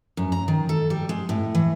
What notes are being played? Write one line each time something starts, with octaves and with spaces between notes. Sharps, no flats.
F#2
A#5
D#3
A4
G3
G#3
A2
E3